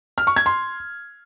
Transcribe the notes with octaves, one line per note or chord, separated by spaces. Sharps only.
F6
C#6
G#6
C6